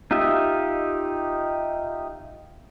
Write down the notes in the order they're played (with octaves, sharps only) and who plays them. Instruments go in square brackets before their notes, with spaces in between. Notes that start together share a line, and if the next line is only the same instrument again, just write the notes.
[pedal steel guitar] D#4 F4 G4 D#5 E5